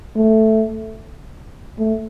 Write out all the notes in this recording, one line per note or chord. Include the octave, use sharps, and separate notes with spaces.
A3
A3